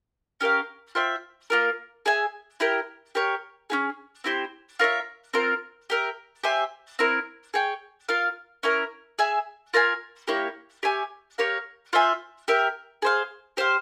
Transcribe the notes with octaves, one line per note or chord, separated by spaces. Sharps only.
C#4 G4 A#4 F5
F4 C5 E5 G5
A#3 F4 A#4
G#4 E5 G#5
E4 G4 A#4
G4 A#4 C#5
C#4 E4 G#4
C4 E4 G4 C5
F4 A#4 C#5 E5
C4 F4 A#4
G4 A#4 E5
G4 C5 E5 G#5
C4 E4 A#4
G#4 C#5 G5
F4 A#4 F5
C#4 E4 A#4
G#4 E5 G#5
F4 A#4 F5 G#5
A#3 E4 G4 C#5
G4 C#5 E5 G#5
G4 A#4 C#5 F5
F4 C5 E5 G#5
G4 A#4 E5
G#4 C5 F5
G4 C5 F5